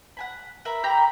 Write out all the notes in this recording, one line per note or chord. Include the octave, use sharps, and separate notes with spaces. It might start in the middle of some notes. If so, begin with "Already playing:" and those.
F#5 G#5 B5
A#4 E5 B5
G4 G5 A#5 B5